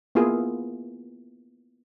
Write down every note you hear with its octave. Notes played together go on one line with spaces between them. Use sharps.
A#3 B3 E4 F4 G#4